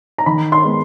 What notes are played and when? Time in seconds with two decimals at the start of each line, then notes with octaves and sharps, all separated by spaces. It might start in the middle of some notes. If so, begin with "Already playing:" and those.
0.18 A#5
0.26 D#3 B5
0.52 C6
0.64 G#3 B3